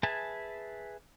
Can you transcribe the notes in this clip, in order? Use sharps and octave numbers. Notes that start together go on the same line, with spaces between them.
G#4 B4 E5 G#5 A5